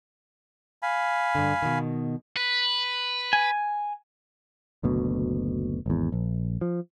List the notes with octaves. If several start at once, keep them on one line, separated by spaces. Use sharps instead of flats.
F5 G#5 B5
G2 D3
B2 D#3
B4
G#5
F#1 D2 B2
G#1 E2
A#1
F3